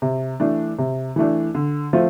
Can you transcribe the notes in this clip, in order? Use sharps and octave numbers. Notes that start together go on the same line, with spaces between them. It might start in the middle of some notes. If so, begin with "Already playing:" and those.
C3
E3 A3 D4
C3
E3 A3 D4
D3
F3 A3 C4 F4